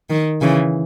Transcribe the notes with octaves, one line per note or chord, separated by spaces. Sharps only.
D#3
C#3 E3